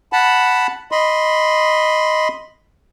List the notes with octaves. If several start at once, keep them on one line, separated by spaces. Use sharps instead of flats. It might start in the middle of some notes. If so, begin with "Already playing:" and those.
F#5 A5 B5
D#5 B5 C6